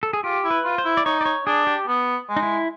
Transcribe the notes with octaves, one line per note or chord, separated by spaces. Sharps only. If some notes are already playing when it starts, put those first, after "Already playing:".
A4
G#4
F4 G4
E4
B4
F4
C5
E4
D5
D#4 C#5
D5
C#5
D4 G#4
G4
B3
G#3
D#4
E4